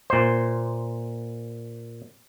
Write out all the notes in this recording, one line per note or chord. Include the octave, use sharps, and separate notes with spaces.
A#2 C5